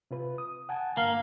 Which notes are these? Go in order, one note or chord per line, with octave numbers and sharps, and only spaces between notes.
C3 F4 B4
D#6
F#5 G#5 A5
G2 D3 A#3 F5